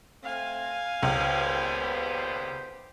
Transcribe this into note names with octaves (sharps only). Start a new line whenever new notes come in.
A3 C4 F5 G#5
C#2 A#2 D#3 B3 G4 C5